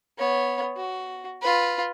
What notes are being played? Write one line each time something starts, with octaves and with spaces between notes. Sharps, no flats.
B3 C#5
F#4
F4 B4